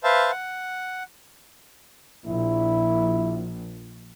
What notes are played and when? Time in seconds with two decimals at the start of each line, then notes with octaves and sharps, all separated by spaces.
0.04 B4 C5 E5 F5 A5
0.31 F#5
2.27 A#1 E4